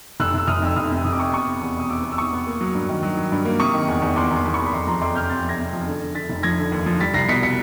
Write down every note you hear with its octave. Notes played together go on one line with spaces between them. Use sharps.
F1 E6 F#6
F1 E6
F1 D#6 F6
F2 E6
F1 D#6 F6
C3
F1 D#6
D6
C3 C#6 D#6
B3 C#6 D#6
B3
E2
B2 D#6
B3 D6 E6
B3
E6
E2 C#6 D#6
B3
A#3
F#3
G2
D#3
F#3
F#3
G2
A#3
C3 C#6 D#6
D#3
E2
E2
E2 C6 D6
E2
C6 D6
E2
B5 C#6
E2
B5
F2 A#5 C6
F3 A#5 C6
F2 C6 D6
C3 F6 G6
C3 G6 A6
F2 G#6 A#6
C3
F3
D3
D3
D3 A6 B6
F1
F3 G#6 A#6
D3
D#2
F3
G3 A6 B6
C2 A#6 C7
B2 B6 C#7
B6 C#7